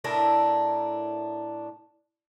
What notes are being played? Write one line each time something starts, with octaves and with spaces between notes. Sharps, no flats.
A2 D4 E4 A#4